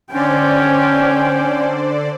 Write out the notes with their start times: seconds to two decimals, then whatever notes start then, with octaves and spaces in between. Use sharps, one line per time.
0.13 D3 C#4 C5 D5 G5